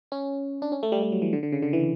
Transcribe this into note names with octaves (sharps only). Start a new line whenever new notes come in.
C#4
D4
C#4
A3
G3
G3
F#3
E3
D3
D3
C#3
D3
E3